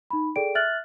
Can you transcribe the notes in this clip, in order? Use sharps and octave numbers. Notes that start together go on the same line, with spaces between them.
D#4 B5
G#4 A4 D5 G5 D7
E5 F6 F#6 A6 F#7